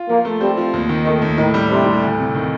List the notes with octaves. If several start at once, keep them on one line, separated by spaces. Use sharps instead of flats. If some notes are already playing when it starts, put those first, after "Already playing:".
Already playing: F4
F3 A#3
A3
G3 C4
F3
D#2
D#3
D#3 A3
D#2
A2 D#3
G3
C3 D4
A2
D2
C3
D#3